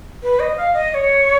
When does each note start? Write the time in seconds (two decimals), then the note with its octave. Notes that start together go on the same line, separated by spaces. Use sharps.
0.23 B4
0.39 D#5
0.56 F5
0.73 D#5
0.90 D#5
0.94 C#5